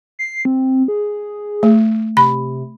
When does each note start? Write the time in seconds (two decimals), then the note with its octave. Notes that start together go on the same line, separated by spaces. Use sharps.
0.19 C7
0.45 C4
0.88 G#4
1.63 A3
2.17 C3 B5